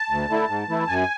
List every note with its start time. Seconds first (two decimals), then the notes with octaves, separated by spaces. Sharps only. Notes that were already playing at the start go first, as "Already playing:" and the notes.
Already playing: A5
0.10 D2
0.29 D3 A3 E4
0.49 G#2
0.69 E3 A3 E4
0.88 F#2 G#5